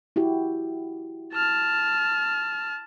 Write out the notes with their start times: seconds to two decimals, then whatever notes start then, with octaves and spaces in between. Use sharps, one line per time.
0.16 E4 F#4 G4
1.33 A5 F6